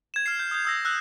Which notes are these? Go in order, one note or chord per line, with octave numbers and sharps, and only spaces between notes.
G#6 E7
F6 G#6 C7
G6
D#6 G6
D#6 E6 A#6
E6 F#6